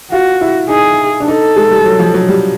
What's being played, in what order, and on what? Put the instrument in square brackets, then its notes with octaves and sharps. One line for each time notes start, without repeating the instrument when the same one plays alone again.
[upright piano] F4 [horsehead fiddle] F#4
[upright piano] E4
[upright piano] D#4 [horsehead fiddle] G#4
[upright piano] D4
[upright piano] D#4 [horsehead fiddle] A4
[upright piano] G#3
G3
F#3
F3
F#3
G3